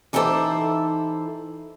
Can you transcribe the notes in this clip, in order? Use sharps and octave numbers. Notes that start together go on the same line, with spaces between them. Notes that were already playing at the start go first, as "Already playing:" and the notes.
E3 D#4 E4 G4 A4 C5